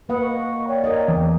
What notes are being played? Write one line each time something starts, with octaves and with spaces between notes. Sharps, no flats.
A#3 B4 F#5 B5 D#6
D#5 C#6
C#5 D5 G5
A#4 D#5
E2